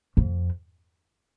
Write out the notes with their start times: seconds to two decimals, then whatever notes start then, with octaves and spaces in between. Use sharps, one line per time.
0.17 F2